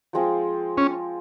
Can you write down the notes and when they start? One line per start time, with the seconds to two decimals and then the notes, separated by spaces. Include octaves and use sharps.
0.13 F3 G#3 C4 F4
0.77 C#4